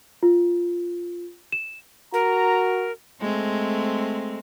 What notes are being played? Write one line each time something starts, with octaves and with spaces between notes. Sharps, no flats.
F4
E7
F#4 A#4 A#5
G#3 A3 C4